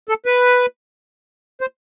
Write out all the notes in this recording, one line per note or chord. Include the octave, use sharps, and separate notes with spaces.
A4
B4
C5